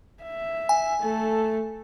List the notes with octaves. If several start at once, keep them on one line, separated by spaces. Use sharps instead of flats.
E5
G#5
A3 A4